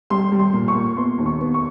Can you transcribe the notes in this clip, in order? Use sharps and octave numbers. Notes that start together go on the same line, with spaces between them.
G3 C6
G3
C6
A#2
C#6
A#2
B3 C6
D#2
C#6
B3
C#6